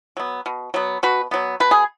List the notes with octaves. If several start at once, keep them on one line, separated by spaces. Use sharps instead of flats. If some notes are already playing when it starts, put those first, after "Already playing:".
F#3 B3
B2
F#3 B3
B2 F#4 B4
F#3 B3
B2 B4
G#4